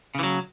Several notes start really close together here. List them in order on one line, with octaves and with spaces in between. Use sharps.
C#3 E3 F#3